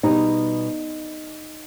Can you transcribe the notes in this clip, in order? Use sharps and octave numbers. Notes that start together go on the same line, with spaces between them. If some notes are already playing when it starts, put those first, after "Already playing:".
B2 G3 D#4